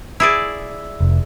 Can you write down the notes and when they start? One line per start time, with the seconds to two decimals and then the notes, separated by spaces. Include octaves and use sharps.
0.20 E4 G#4 D5
1.00 F1